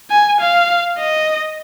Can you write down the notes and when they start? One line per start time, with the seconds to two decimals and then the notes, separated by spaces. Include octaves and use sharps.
0.10 G#5
0.40 F5
0.98 D#5